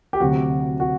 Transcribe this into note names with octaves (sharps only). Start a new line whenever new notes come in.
G4
D2 C3 F#3 F#4
F#4